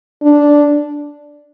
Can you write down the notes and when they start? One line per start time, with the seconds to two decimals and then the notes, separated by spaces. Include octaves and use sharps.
0.23 D4